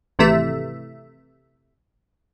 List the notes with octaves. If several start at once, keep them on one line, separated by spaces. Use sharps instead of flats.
G#1 C3 E3 A3 E5